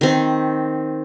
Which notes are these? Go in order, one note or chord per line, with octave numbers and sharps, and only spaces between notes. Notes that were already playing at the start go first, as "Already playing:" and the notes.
D#3 C4